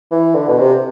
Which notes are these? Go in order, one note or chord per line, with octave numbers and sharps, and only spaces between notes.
E3
D3
B2
C3